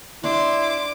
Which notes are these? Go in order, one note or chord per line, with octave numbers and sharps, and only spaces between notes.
D4 E4 C6 D6